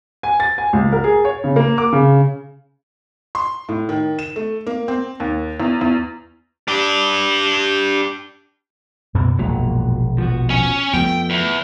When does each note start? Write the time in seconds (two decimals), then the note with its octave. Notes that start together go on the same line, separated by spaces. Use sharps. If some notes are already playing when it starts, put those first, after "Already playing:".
0.23 G#5
0.40 A6
0.58 G#5
0.73 C#2
0.92 A#4
1.04 G#4
1.25 C#5
1.44 C#3
1.56 A#3
1.78 D6
1.93 C#3
3.35 C6
3.69 A2
3.89 D#3
4.19 E7
4.36 A3
4.67 A#3
4.88 C4
5.20 D#2
5.60 E2
5.81 E2
6.68 D4 G4
9.15 F#2 B2 A#3
9.39 E1 A#1 F#2 A#2 F#3 G#3
10.18 F3 B3 F#4
10.50 C#4
10.94 F2 F3 A3 B3 G5
11.30 E2